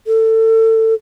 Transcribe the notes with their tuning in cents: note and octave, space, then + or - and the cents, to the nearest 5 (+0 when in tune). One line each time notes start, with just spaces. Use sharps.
A4 +25